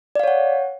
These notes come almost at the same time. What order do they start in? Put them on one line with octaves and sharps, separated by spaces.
D5 F5 C#5 F#5